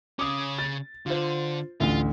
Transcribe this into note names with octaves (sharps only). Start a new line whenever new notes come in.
C#3 C#4 D6 D#6
A6
D3 F4 C5
A1 D2 F4